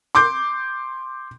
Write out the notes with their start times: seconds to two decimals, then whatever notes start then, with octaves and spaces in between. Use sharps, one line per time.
0.15 C6 D6 G6